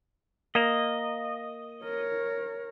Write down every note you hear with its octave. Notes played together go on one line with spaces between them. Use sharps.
A#3 D#5
A#4 C#5